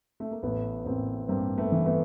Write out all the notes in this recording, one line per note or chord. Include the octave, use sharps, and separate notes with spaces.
A3
A#3
A1 A3 B3
A1 A#3 C4
G2 A#3 C4
A3 B3
E3
A3 B3